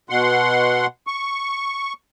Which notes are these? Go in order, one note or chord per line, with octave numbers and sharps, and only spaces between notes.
B2 F#5 C6
C#6